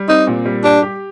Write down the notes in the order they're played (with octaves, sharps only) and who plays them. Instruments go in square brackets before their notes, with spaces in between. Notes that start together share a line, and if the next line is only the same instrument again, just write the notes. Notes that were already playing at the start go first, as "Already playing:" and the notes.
Already playing: [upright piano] G3
[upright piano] C4 [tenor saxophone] D#4
[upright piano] A#2
G3
[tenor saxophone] D4 [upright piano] G4
[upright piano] G4